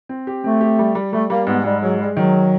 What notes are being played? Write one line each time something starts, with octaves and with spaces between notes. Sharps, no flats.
C4
G4
A3 C4
G4
G3
G3
G3 A3
G3 A#3
G#2 B3
G#2 G3
F#3 G#3
G3 G#3
D#3 F#3